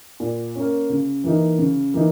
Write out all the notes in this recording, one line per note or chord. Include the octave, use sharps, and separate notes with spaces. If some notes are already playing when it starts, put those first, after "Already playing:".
A#2
A#3 C#4
C#3
E3 A#3 D#4
C#3
E3 A#3 D#4